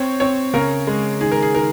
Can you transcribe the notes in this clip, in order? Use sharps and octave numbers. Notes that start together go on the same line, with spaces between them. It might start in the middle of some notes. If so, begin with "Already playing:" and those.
Already playing: C4 C#5
C4 C#5
C#3 A#4
G#3
D#3 G#4
A#4
G#4
D#3 A#4